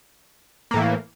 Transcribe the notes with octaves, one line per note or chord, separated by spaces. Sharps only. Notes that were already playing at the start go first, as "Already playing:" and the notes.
A2 E3 A#3